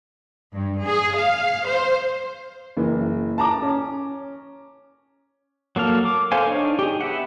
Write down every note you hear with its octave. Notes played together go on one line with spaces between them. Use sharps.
G2
G#4
F5
C5
F#1 E3
A5 A#5 D6
C#4
F#3 A#3 A4 F6
D6
A4 C5 F5 G#5
D4 D#4 C#5
G4 G#4
B3 E5 F#5